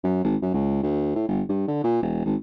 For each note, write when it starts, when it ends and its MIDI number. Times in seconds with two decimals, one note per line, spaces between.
0.04 0.22 42
0.24 0.36 32
0.42 0.52 42
0.54 0.81 37
0.82 1.15 38
1.15 1.23 45
1.28 1.42 31
1.49 1.64 43
1.68 1.79 50
1.83 2.00 46
2.02 2.24 28
2.25 2.35 32